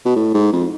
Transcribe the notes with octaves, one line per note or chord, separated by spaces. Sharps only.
B2
A2
G#2
F2